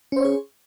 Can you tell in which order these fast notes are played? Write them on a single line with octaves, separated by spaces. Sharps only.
C#4 C5 C#5 G#4